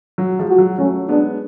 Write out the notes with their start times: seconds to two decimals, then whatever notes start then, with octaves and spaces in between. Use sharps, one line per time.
0.18 F#3
0.39 F3 G#3
0.49 F#4
0.58 F#3
0.79 F#3 A3 C#4
1.09 G#3 B3 D4